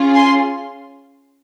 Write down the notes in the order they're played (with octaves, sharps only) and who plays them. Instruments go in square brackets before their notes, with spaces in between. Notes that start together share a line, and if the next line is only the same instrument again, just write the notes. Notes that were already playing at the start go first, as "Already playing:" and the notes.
Already playing: [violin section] C#4 F4 G#4
G#5 C6